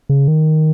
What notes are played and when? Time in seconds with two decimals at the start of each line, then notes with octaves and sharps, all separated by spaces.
0.09 C#3
0.28 D#3